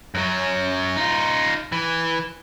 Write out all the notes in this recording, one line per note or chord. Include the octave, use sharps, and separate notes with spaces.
F#2 F#3
D#4 F4
E3